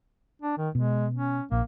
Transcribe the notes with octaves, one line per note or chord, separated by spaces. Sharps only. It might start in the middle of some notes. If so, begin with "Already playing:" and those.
D4
D#3
B2 G#3
C#4
A#1 A#3